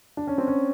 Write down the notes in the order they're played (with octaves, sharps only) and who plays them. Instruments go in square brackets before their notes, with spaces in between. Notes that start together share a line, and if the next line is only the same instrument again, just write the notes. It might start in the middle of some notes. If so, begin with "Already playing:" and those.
[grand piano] D4
C#4
C4
C#4